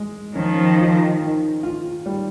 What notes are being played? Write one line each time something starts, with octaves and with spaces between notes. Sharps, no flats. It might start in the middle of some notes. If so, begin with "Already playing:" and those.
Already playing: G#3
D#3 F3 C#4
F4
D#3
F4
G3